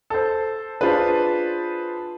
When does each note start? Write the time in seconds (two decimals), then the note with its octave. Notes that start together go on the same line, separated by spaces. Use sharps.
0.10 A4 C5
0.81 D4 F4 G#4 B4 C5 A5